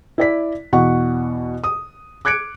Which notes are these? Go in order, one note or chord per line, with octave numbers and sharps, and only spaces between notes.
E4 D5 B6
E2 B2 F#5 C#6
D#6
D6 F#6 G#6 C#7 D7